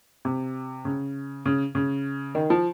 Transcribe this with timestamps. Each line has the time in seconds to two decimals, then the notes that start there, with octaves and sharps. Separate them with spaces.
0.25 C3
0.85 C#3
1.46 C#3
1.75 C#3
2.35 D#3
2.50 F3